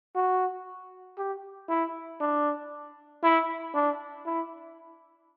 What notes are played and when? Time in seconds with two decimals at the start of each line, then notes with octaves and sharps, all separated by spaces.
0.15 F#4
1.18 G4
1.69 E4
2.21 D4
3.23 E4
3.74 D4
4.25 E4